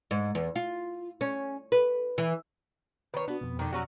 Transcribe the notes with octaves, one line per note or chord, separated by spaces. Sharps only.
G#2
E2
F4
C#4
B4
E3
D#3 B4 C#5
B3 D4 F#4
F2 B2
D3 D#3
F#3 C#4 F#4